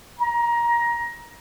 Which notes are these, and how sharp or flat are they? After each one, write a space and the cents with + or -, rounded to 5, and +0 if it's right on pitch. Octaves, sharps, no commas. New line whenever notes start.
A#5 +20